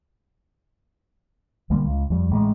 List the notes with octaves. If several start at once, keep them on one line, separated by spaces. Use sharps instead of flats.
B1 D3 G3 A#3
C#2
F2 G3
A1 G#3